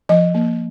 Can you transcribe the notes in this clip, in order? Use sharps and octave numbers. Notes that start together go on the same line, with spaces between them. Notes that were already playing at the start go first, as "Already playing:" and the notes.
F3 D#5
A#3